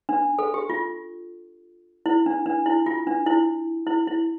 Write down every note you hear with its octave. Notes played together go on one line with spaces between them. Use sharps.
D4
A4
G4
F4
E4
D4
D4
E4
F4
D4
E4
E4
E4